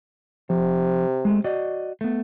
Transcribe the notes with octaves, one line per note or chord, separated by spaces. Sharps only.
C3 F3
G#3 A3
F#4 D5 D#5
A3 B3